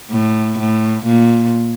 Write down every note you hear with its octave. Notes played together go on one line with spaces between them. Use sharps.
A2
A2
A#2